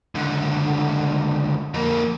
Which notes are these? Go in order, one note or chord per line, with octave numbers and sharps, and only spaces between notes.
C#2 D3
F2 A#3